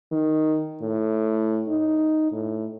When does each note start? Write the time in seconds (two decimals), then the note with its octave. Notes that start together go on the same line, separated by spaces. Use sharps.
0.12 D#3
0.82 A2
1.68 D#4
2.32 A2